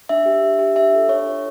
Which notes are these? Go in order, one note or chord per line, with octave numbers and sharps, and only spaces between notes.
D4 E5
G4
D4
G4
D4 E5
F4 A4
D4 C#5
F4 A4